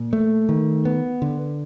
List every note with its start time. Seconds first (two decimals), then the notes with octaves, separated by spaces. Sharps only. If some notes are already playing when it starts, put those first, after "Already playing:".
Already playing: A#2
0.13 A3
0.49 D#3
0.85 B3
1.22 D3